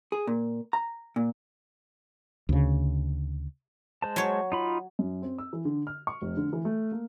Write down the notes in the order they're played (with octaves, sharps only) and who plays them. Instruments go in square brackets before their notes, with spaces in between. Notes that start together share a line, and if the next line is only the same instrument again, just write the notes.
[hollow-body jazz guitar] G#4
A#2
A#5
A#2
[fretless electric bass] D2 C#3
[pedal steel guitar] G#3 C5 A5
[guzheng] F#3 C#5
[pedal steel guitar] D#4 F4 B5
[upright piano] F#2
C4
E6
E3
D3
F6
C#6
F1
D3
E3
A3
A#3